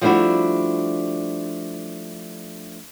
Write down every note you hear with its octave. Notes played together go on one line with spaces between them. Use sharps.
F3 G3 A3 D4 E4 F#4